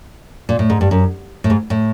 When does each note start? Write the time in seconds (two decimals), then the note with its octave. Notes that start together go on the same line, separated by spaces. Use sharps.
0.49 A#2
0.59 A2
0.70 G#2
0.81 G2
0.91 F#2
1.44 A2
1.50 G#2
1.70 A2